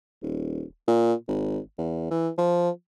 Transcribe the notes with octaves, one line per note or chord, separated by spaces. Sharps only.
D#1
A#2
G#1
E2
E3
F3